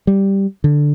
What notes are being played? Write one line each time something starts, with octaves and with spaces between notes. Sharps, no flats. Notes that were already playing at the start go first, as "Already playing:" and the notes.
G3
D3